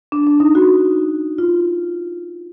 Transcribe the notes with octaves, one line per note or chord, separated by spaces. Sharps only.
D4
D4
D#4
F#4
F4